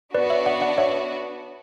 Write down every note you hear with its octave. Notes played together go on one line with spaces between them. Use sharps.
B3 D4 F#4 B4 D5
C#5 E5
D5 F#5
D5 F#5
C#5 E5